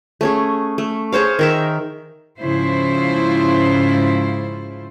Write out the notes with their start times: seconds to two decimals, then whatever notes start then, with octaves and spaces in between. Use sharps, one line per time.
0.21 A3 C#4 G#4
0.78 A3
1.12 G#4 C5 C#5 F5
1.39 D#3 A#4 E5
2.39 G#2 C#3 F3 E4 F4 C5